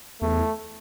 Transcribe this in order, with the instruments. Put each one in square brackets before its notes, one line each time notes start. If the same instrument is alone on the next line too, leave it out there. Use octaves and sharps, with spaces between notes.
[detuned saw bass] E2 [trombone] A3